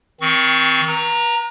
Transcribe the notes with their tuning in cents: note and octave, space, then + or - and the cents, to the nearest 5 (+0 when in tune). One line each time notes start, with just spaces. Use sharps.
D#3 +30 C4 +0 C#6 +25
B4 -45 A#5 -5